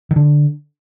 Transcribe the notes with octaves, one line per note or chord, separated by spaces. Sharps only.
D#3
D3